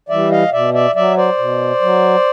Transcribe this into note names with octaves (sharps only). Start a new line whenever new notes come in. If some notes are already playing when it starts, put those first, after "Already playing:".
E3 G3 D5 E5
D#5 F5
B2 D5 E5
D5 E5
F#3 D5 E5
C5 D5
B2
F#3